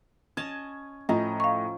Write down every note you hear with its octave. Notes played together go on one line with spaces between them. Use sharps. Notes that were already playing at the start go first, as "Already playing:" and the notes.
C#4 D#5 A5 G#6
A2 F3 C#4 D#5 A#5
F5 C#6